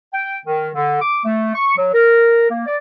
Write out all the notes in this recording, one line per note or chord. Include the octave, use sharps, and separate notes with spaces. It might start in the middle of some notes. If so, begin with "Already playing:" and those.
G5
D#3
D3
D6
A3
C#6
F#3
A#4
A#3
D5